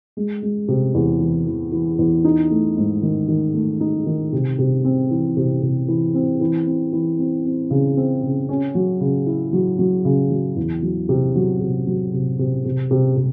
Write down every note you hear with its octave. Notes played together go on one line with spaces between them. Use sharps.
G#3
G#3
C3
E2
E3
E3
E3
E2
D#4
A3
G#2
D#3
D#3
A3
D#4
D#3
C3
C3
C4
E3
C3
C3
E3
C4
E3
C4
E3
C4
C4
C#3
C4
C#3
C#4
F#3
C#3
E4
F#3
F#3
C#3
F#3
E2
F#3
C3
F#3
C3
F#3
C3
C3
C3
C3
C3